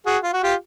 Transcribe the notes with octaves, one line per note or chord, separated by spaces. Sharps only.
F#4 G#4
F4
F#4
F4 G4